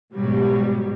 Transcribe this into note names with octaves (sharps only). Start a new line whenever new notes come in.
G#2 B2 F#3 G3